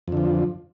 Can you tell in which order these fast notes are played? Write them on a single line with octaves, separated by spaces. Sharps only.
F2 D3 F3